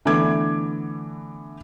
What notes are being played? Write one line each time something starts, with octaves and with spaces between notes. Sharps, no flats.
D3 E3 A3 B3 D6 G#6